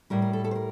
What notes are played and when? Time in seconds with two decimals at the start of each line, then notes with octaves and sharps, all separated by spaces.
0.10 A2 G3 A#4
0.22 A#4
0.33 A4
0.44 A4
0.51 C5
0.55 A#4